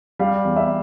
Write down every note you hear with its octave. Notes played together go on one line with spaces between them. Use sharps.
G3 F5
E2
E5